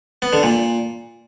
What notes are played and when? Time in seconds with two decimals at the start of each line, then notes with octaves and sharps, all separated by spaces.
0.22 B3
0.33 D3
0.43 A#2